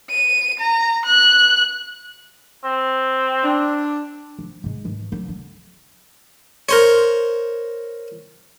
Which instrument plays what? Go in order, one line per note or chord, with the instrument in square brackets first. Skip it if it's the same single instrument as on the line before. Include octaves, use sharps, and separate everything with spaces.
[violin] D#7
A#5
F#6
[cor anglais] C4
[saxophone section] D4
[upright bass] F3
G#2 G#3
E3
D3 F#3
D3
[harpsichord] A#4 C5 C#5